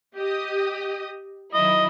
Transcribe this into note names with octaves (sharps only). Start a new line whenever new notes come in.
G4 D#5 D#6
D#3 F#3 E4 D#5